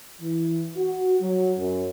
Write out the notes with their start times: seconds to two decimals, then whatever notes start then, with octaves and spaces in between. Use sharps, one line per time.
0.21 E3
0.77 F#4
1.21 F#3
1.58 F#2